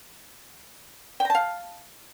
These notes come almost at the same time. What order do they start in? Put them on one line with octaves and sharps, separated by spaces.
G5 A#5 A5 F5